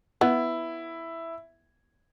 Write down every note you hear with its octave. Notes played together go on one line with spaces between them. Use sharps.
B3 E4